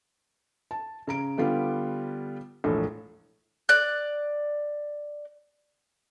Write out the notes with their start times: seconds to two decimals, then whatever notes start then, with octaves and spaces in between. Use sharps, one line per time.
0.71 A5
1.07 C#3 A#5 D7
1.38 D3 G3 B3 F4 G4
2.64 E1 A#1 A2 A4
3.69 D5 F#6